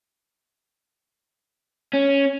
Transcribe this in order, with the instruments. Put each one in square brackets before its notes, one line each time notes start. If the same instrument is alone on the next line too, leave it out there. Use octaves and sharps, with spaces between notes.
[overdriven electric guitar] C#4